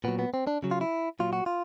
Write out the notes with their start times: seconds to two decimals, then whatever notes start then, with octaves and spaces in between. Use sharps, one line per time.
0.04 A#2 F#3 B3
0.19 B3
0.34 C4
0.47 D4
0.63 C#3 F#3
0.71 F4
0.81 E4
1.19 A#2 F#3 F4
1.33 F#4
1.46 F4